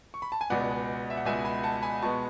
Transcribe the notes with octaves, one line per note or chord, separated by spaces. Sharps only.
C#6
B5
A5
G#5
C#2 B2 G#3 B3 D5 F#5
E5
F#5
C#2 B2 G#3 B3 E5 G#5
G#5 B5
F#5 A5
G#5 B5
B2 G#3 B3 A5 C#6